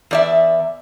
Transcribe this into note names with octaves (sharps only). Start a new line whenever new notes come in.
E2 D5 E5